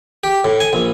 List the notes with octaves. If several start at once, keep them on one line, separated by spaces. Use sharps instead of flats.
G4
A2
G#5
A#1